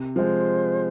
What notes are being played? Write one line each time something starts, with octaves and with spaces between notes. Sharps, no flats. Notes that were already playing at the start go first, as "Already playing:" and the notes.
Already playing: C3
F3 G#3 C5